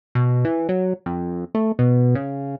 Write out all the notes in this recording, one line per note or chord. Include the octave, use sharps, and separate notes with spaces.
B2
E3
F#3
F2
A3
B2
C#3